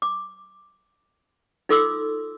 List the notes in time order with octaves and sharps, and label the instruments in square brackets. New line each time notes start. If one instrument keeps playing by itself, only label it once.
[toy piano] D6
D#4 F4 A4 C6 D6 E6